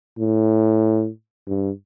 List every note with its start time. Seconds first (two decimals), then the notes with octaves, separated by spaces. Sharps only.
0.19 A2
1.48 G2